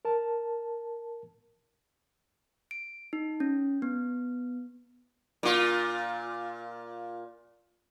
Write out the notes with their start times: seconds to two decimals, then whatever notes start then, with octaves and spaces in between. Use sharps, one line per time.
0.05 A#4 A5
2.71 D7
3.13 D#4
3.40 C#4
3.82 B3
5.43 A#2 F4